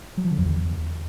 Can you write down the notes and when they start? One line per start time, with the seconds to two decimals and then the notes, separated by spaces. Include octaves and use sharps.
0.17 F#3
0.24 F3
0.31 D3
0.38 F2
0.45 E2